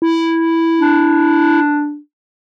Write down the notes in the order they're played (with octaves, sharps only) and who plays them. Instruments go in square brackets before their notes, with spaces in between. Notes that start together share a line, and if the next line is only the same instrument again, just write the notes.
[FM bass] E4
[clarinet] D4